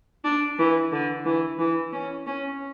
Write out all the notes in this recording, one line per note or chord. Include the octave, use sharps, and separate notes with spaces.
D4
E3
D3
E3
E3
C#4
C#4